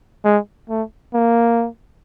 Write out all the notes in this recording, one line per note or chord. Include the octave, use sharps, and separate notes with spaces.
G#3
A3
A#3